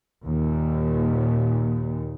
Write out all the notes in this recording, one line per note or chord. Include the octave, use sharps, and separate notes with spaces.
D#2 A#2